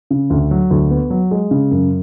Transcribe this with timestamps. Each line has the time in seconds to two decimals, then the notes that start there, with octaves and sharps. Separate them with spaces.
0.10 C#3
0.30 D2
0.51 F#3
0.71 D2
0.90 B3
1.10 F#3
1.31 G#3
1.51 C#3
1.71 F#2